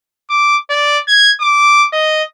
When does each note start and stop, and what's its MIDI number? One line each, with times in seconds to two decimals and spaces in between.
0.30 0.56 86
0.70 0.99 74
1.08 1.32 92
1.41 1.87 86
1.93 2.23 75